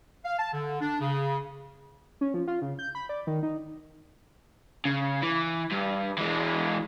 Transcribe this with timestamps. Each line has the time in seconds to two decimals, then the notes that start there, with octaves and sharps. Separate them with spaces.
0.25 F5
0.39 A5
0.53 D3
0.81 D4
1.01 C#3
2.21 C#4
2.34 F3
2.48 F4
2.62 C#3
2.79 G6
2.95 B5
3.09 D5
3.27 D#3
3.43 D#4
4.85 C#3
5.22 E3
5.71 G2
6.18 E3 G#3